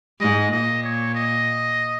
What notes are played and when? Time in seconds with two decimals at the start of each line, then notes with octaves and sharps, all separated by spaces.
0.21 G#2 D#5
0.51 A#2 D#5
0.83 C#5
1.15 D#5